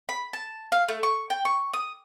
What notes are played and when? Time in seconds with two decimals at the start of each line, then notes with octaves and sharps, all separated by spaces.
0.09 B5
0.33 A5
0.72 F5
0.88 A3
1.03 C#6
1.30 G5
1.45 C#6
1.73 D#6